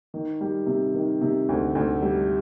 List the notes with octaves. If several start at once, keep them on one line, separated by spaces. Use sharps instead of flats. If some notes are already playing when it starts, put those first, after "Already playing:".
D#3
G3
C3
D#3
C3
D2
D2
G3